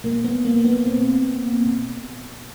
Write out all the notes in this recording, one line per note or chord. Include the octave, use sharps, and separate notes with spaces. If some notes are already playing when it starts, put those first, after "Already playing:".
B2 A#3
B3
A#3
B3
B2 C4
B2